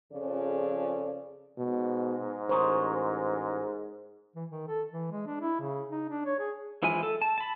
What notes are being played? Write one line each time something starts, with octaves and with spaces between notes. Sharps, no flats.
F2 C#3 F3 G#4 A4 D5
G#2 B2
A1 G#4 A#4 C5 C#5
E3
D#3
A4
E3
G#3
D4
E4
C#3
D#4
D4
C#5
G#4
E3 F3 G#3 E4 G#5
A4
A5
A5 B5